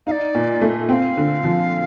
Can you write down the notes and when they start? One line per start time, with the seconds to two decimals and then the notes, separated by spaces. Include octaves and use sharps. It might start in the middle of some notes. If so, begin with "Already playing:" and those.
0.07 D#4 F5
0.11 D5
0.35 A#2
0.62 A3
0.89 C4 G5
0.93 F5
1.17 D3
1.44 F3